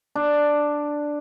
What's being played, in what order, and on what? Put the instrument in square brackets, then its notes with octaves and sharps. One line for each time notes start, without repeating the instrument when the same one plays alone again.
[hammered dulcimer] D4